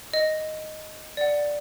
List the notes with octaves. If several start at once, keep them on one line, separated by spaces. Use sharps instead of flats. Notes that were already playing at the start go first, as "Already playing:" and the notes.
D#5
D5 F#5